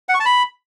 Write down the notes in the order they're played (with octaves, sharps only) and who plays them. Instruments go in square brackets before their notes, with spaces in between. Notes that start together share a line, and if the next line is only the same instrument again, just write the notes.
[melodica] F#5
C#6
A5
B5